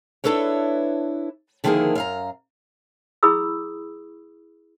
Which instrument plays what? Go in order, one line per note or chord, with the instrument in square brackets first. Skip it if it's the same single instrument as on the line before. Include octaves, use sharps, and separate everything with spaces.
[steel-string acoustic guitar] D4 E4 A4 B4 C#5
D3 D#3 F3 A#3 E4 G#4
F#2 F5 A#5
[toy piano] E4 G#4 B5 C#6 D#6 E6